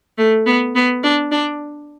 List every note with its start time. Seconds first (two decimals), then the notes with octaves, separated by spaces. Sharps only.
0.18 A3
0.46 B3
0.75 B3
1.03 D4
1.32 D4